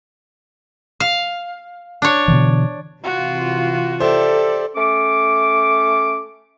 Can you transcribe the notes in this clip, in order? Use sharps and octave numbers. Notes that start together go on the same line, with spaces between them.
F5
D4 C#5
B2 D3 E3
C3 E3 F4 F#4
G4 A4 C5 D5 E5
A3 C#4 D6